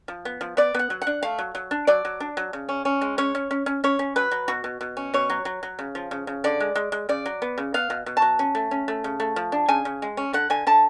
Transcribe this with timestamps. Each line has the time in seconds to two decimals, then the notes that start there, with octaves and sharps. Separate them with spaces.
0.08 F3
0.25 B3
0.41 F3
0.57 B3 D5
0.74 B3 F#5
0.90 F#3
1.02 F#5
1.07 D4
1.23 A3 F5
1.39 F#3
1.55 F#3
1.71 D4
1.87 F#3 D5
2.05 F#3
2.20 D4
2.37 F#3
2.53 C#3
2.69 C#4
2.85 C#4
3.01 G#3
3.18 C#4 C#5
3.35 C#4
3.51 C#4
3.66 C#4
3.84 C#4 C#5
3.99 C#4
4.16 F#3 B4
4.31 F#3
4.48 B2 F#4
4.64 B2
4.81 B2
4.97 C#4
5.14 B2 C#5
5.30 F#3
5.45 F#3
5.63 F#3
5.79 C#3
5.95 F3
6.11 C#3
6.27 C#3
6.44 D3 D5
6.60 G#3
6.76 G#3
6.92 G#3
7.09 C#3 D5
7.26 F#3
7.42 B3
7.58 C#3
7.74 B3 F5
7.90 B2
8.06 B2
8.17 A5
8.22 F#3
8.39 C#4
8.55 A3
8.71 C#4
8.88 A3
9.04 C#3
9.20 A3
9.36 F3
9.52 D4
9.68 C#3 G#5
9.85 C#3
10.02 G#3
10.17 C#4
10.33 D3 F#5
10.50 D3 G#5
10.67 D3 A5